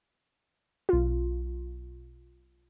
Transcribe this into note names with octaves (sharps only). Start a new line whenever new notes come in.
B1 F4